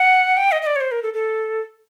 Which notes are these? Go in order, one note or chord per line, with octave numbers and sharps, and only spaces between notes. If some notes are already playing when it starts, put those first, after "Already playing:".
Already playing: F#5
G5
D#5
D#5
D5
C#5
C5
A#4
A4
A4